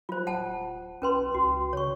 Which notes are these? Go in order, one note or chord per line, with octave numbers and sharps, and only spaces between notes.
F#3 F4 C5
D1 F#5 A5
B1 C#4 B4 C6
C#2 F#4
C#3 C#5 C#6